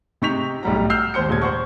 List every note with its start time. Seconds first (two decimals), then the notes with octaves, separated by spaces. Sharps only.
0.22 C3 D#4 C#6 G6 B6 F7
0.63 B1 A2 G3 F#5 A#5
0.90 E6 F6 G6 C7
1.14 D#2 G#2 C5 G6 C#7
1.29 D#1 A#2 G#6
1.42 C5 F#5 C#6